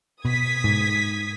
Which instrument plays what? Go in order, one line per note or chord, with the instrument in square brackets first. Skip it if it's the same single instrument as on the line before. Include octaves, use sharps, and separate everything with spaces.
[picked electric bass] B2 [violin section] D#6 G#6 B6
[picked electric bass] G#2